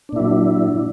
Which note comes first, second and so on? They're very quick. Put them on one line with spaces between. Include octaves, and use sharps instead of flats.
D4 A#2 E4 F#3